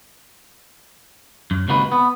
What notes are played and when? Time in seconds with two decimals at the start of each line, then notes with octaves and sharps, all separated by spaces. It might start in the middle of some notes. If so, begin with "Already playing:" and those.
1.51 F#2
1.68 C#2 C3 D#3 A#3 F#4 B4
1.92 B3